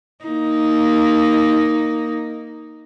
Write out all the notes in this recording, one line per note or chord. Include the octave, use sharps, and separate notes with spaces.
A#3 D#4